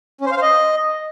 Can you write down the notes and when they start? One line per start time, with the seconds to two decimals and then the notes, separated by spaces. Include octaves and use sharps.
0.21 C#4
0.26 C5
0.31 F5
0.37 C5
0.42 D#5